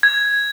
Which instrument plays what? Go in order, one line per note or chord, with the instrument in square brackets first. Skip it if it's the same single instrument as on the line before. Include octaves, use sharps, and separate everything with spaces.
[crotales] G#6